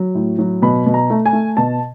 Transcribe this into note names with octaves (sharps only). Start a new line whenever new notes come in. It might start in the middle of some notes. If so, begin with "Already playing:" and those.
Already playing: F#3
A2
F#3
B2 B5
B2
A#5
A3
G#5
A3
B2 A5